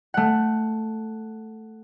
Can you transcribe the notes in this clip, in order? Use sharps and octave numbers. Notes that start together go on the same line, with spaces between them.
A3 F#5